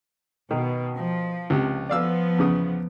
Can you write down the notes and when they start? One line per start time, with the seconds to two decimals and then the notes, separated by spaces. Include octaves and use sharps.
0.51 B2 D#3
0.95 F3
1.50 C#2 C3
1.89 F3 B3 D5 F5 E6
2.39 E2 C#3 D#6